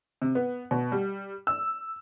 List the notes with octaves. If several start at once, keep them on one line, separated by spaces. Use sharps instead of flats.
C3
B3
B2
G3
E6